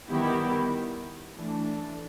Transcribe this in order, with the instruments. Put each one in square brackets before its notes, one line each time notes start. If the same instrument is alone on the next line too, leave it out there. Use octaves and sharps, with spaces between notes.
[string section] D#3 G3 B3 E4 G4
E3 A3 D4